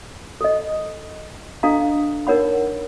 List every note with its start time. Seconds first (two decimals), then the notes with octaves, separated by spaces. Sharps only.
0.41 A4 D#5
1.63 D4 A4 D#5 F5 A#5
2.27 D#4 A#4 C#5 F#5 B5